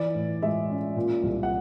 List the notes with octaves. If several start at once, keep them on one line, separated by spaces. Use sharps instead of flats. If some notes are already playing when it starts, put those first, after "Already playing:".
Already playing: E3 D5
A2
G#3 E5
C#4
A#2
C2
F#5